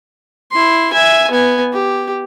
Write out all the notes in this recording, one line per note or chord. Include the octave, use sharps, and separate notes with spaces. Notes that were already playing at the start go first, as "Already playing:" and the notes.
E4 C6
E5 G#5
B3 G#5
G4